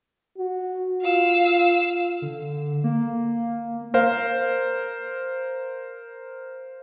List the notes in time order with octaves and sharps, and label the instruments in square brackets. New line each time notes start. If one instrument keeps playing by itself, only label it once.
[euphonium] F#4
[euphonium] F4 [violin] F5 E6
[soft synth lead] D3
A#3
[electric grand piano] A#4 C5 F5